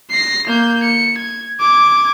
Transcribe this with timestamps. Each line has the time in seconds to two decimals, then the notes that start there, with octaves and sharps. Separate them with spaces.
0.10 A#6 C7
0.47 A#3 G6
0.83 C#7
1.18 G#6
1.60 D6 G#6